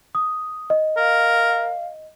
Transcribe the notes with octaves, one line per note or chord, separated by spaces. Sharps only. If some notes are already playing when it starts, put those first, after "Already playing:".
D#6
D#5
A#4 F5